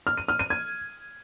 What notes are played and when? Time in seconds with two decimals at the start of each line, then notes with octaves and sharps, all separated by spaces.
0.07 F6
0.18 D#7
0.28 F6
0.39 D#7
0.50 G#6